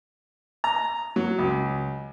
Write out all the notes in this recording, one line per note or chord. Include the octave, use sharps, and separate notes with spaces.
A#5
F#3
C#2